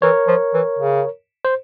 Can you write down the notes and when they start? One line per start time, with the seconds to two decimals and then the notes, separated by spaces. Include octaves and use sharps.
0.02 E3 A#4 C#5
0.27 F3
0.54 E3
0.79 C#3
1.45 C5